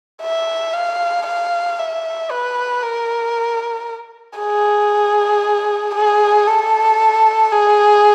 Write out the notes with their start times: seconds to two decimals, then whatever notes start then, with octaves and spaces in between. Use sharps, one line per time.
0.22 E5
0.73 F5
1.27 F5
1.79 E5
2.30 B4
2.83 A#4
4.39 G#4
5.95 G#4
6.47 A4
7.52 G#4